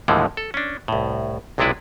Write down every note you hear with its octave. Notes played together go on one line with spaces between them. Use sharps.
D#2 A2 D3 E3 F3 G#3
A4
C#4 D4
C2 A2
B1 C3 G#3 D4 E4 B4